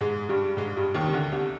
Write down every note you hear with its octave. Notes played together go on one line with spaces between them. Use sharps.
G#2 G#3
G2 G3
G#2 G#3
G2 G3
D#2 D#3
C3
D2 D3
C2 C3